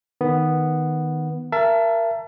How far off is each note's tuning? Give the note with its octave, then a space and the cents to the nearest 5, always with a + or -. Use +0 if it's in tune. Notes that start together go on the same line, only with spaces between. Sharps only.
D#3 +0 B3 +0
A#4 +0 E5 +35 A5 +0